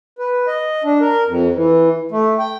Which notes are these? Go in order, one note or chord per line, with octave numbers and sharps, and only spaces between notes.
B4
D#5
D4
A#4
F2
E3
A3
G5